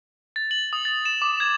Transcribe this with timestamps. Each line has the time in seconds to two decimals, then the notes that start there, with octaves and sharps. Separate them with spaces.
0.36 A6
0.51 F#7
0.73 D#6
0.85 A6
1.05 E7
1.22 D6
1.40 G#6